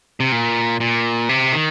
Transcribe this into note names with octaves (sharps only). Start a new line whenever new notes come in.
C3
A#2
A#2
C3
D#3